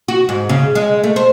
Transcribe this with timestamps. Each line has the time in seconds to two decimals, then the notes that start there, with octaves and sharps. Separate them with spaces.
0.08 F#4
0.29 G#2
0.49 C#3
0.75 G#3
1.04 A3
1.16 C5